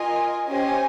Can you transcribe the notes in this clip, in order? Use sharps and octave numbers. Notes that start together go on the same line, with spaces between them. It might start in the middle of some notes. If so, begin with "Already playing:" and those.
Already playing: F4 A#4 D#5 G#5
C#4 G4 C5 D#5 G#5